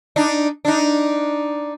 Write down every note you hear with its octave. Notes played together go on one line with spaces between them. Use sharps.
D4 D#4
D4 D#4